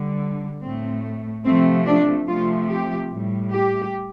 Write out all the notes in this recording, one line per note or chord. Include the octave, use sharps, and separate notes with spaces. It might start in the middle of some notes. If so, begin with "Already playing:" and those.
Already playing: D3 G3
A2 A3 C4
C3 F3 A3 C4
D4
C3 F3 A3 F4
G4
A2 G3
G4